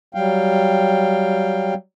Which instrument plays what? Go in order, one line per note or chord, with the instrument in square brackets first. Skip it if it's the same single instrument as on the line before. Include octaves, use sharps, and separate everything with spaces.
[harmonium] F#3 G3 F5 G5